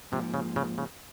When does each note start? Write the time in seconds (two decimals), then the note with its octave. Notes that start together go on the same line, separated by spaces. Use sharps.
0.12 G#2 C3 F3 A#3
0.34 C#3
0.56 C#3
0.78 C#3